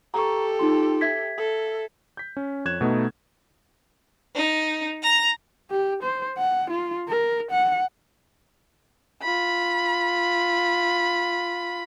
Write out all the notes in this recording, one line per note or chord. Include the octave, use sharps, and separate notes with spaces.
G4 A4 A#5 C#6
D#4 F4 C6
E5 G#6 B6
A4
G6 B6
C#4
F2 C#5 F#6 G#6 E7
B2 A3 B3 D#4
D#4
A#5
G4
C5
F#5
F4
A#4
F#5
F4 B5